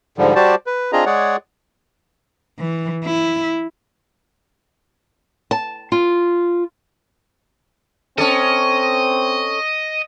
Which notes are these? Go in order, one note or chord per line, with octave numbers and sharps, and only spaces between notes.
G#2 D3 F3 G3
G3 F#4 G4 C5 D5 A5
B4
C4 D4 F4 G#4 D#5 A#5
G#3 G#4 C#5 D5 F#5
E3
E4
A5
F4
C4 C#4 A4 D#5